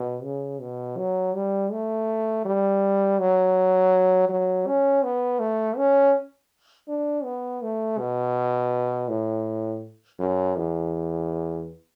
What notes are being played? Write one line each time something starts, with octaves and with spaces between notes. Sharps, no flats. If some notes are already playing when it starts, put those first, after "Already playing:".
Already playing: B2
C#3
B2
F#3
G3
A3
G3
F#3
F#3
C#4
B3
A3
C#4
D4
B3
A3
B2
A2
F#2
E2